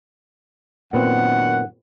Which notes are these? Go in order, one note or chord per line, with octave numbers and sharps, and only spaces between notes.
F#2 A#2 D#3 B3 C4 F#5